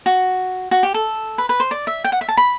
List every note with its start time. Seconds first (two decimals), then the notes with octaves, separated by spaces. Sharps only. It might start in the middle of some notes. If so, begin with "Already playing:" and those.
0.06 F#4
0.71 F#4
0.83 G4
0.94 A4
1.38 B4
1.49 B4
1.60 C5
1.71 D5
1.87 E5
2.04 G5
2.12 F#5
2.21 E5
2.29 A5
2.37 B5